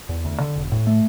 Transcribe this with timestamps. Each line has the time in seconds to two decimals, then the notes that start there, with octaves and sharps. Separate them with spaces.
0.09 E2
0.25 D2
0.40 D3
0.56 E1
0.72 A2
0.87 A3